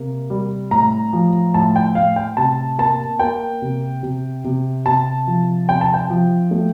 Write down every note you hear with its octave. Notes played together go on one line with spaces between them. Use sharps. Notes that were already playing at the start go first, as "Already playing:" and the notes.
Already playing: C3 A#3
G3
A2 A#5
F3
A2 A5
G5
A2 F5
G5
C3 A5
A#3 A5
A#3 G5
C3
C3
C3
C3 A5
F3
C3 G5
A5
G5
F3
A3